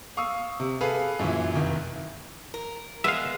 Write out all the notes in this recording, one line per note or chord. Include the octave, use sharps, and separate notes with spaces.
F5 C#6 D#6 E6
C3
G#4 A4 B4 F5
F#2 A#2 E3
F1 D#3 E3
A#4
G#3 B3 E5 F5